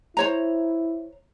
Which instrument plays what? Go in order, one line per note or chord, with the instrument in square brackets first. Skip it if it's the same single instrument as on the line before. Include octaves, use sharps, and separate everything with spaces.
[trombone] E4 [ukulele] C5 C#5 A#5